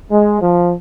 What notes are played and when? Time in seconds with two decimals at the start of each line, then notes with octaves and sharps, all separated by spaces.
0.11 G#3
0.41 F3